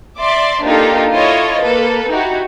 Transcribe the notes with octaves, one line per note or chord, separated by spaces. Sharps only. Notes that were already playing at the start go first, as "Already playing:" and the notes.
D5 E5 C6 D6
A#3 D4 D#4 F4 G4 A4
E4 F4 A4 C#5 D#5
A#3 A4 B4
D#4 E4 F#4 G4